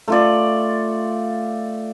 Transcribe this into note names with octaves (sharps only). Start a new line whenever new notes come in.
A3 F4 D5